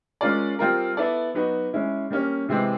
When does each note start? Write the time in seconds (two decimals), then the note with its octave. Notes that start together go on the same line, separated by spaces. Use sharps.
0.21 G#3 C#4 F4 A#4 D5
0.59 G3 C4 F4 A#4
0.97 B3 E4 A4 D5
1.34 F#3 B3 D#4 F#4 B4
1.73 G#3 C#4 E4
2.11 G3 A#3 C#4
2.49 C3 E3 G#3 C4